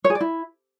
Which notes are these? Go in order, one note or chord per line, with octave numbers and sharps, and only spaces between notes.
C#5
G#4
D5
E4